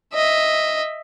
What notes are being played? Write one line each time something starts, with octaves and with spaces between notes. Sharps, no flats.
D#5 E5